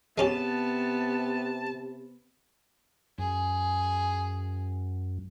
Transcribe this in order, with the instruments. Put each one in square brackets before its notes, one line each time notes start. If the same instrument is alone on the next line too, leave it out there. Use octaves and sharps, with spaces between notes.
[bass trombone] C3 [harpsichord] G#3 C#4 G4 [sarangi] B3 [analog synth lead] A5
[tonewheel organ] F#2 [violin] G#4